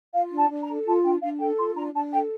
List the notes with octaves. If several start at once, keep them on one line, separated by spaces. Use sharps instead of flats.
F4 F5
D4
A5
D4
A#5
A4
F4 A5
D4 G5
D4 F5
A4 G5
F4 C6
D4 A#5
D4 A5
A4 G5